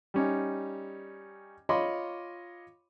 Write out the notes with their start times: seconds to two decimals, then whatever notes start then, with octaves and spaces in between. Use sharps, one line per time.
0.14 G3 C#4 D#4
1.69 F4 C#5 D#5 B5 C6 D6